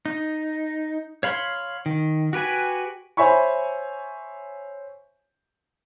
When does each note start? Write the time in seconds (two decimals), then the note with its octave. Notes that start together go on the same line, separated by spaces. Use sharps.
0.06 D#4
1.23 C#5 F5 B5 C6
1.86 D#3
2.33 F#4 G4 B4 G#5
3.17 C5 C#5 E5 G#5 B5 C#6